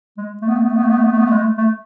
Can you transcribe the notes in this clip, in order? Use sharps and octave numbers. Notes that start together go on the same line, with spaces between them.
G#3
A3
B3
A3
B3
A3
B3
A3
B3
A3
B3
A3
B3
A3
G#3
A3
A3